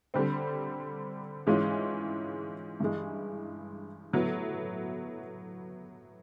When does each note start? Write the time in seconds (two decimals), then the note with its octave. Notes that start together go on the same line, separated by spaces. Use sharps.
0.14 D3 G3 C4
1.47 G#2 E3 G#3 C#4 F4
2.80 G2 E3 G#3
4.13 A2 F#3 B3 E4